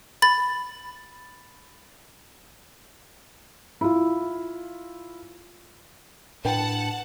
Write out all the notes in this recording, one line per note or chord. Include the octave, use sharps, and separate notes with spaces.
B5 A6
E4 F4
A2 D4 B4 F#5 G5 A5